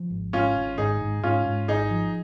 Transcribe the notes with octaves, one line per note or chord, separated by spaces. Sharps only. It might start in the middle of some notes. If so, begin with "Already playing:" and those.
Already playing: F3
G#1
G#2 C#4 F4
G#1
G#2 D#4 G#4
G#2
G#2 C#4 F4
G#2
G#1 D#4 G#4
F3